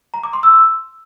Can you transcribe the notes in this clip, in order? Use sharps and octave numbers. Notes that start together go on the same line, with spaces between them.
A#5
D6
C6
E6